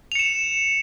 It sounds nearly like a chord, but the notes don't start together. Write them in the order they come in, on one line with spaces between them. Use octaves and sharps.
F7 C#7 E7